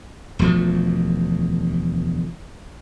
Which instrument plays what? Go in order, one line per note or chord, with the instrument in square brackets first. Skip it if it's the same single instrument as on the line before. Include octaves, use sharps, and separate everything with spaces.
[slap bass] E1 D2 F3 A3